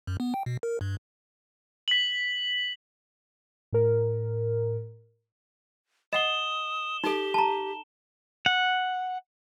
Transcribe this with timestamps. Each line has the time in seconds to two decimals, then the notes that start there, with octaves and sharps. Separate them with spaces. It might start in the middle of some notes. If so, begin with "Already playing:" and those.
0.07 F#2
0.20 B3
0.34 G5
0.46 B2
0.63 A#4
0.81 G2
1.88 B6 F#7
3.72 A2 A#4
6.13 D#5 F#5 D#6 E7 G7
7.04 D#4 G4 A4
7.34 A5 A#5
8.46 F#5